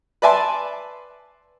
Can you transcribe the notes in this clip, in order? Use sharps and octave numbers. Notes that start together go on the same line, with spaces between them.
B4 D5 E5 G#5 A5 C6